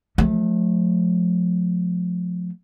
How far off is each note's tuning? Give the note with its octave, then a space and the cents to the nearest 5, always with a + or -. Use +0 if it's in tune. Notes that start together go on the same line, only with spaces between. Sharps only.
F3 +30 A3 -25